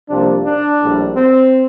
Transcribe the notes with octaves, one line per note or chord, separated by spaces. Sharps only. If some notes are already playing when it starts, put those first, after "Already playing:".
C2 C3 F3 A#3 D4
D4
A#1 A2 G3
C4